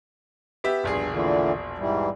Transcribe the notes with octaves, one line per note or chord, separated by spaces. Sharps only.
B3 G4 E5
E1 A#1 G2 G#4
A#2 D3 E3
G#2 E3 G3